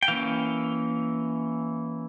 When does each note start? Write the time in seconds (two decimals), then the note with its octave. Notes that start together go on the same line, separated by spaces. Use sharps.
0.03 G5
0.08 E3 A#3 C#4 F5